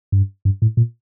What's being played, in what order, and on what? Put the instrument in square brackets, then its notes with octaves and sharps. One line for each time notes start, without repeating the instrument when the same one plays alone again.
[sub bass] G2
G2
A2
A#2